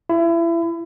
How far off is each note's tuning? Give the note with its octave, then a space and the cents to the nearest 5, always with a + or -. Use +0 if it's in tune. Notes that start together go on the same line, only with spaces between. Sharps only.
E4 +30